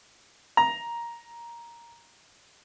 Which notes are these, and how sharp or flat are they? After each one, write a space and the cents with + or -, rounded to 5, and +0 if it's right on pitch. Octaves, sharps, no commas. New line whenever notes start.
A#5 +10